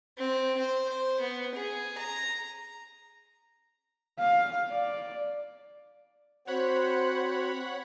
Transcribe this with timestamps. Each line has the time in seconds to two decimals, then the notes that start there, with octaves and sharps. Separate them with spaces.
0.18 C4
0.57 C5
0.89 C5
1.20 B3
1.55 G#4
1.98 A#5
4.19 F5
4.71 D5
6.47 C4 F#4 C5 C#5 F#5 B5